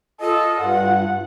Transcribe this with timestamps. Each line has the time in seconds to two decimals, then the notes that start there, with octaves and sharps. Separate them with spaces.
0.21 F4 A4 D#5
0.60 G2 F#5